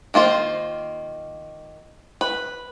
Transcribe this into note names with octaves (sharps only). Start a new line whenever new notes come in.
D#3 A#3 F4 C5
B4